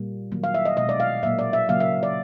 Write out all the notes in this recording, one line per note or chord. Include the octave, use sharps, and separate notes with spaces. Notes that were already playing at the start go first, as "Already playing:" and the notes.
Already playing: A#2 G3 A#3
D#3 F#3 A#3
F5
E5
D#5
B2 G#3 D#5
D5
F5
A#2 F#3 A#3 E5
D5
E5
C#3 F#3 A#3 F5
E5
D5